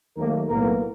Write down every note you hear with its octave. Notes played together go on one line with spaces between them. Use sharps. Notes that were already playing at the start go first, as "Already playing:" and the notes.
D#2 D#3 F#3 A3 A#3 A#4
B1 A2 F#3 A#3 B3 A#4